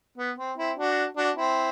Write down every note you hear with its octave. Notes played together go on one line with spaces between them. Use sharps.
B3
C4
C4 E4
D4 F#4
D4 F#4
C4 E4